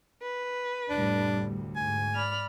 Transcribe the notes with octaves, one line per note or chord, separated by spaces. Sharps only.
B4
F1 A2 G3 D4
D2
G#2 G#5
D5 B5 F6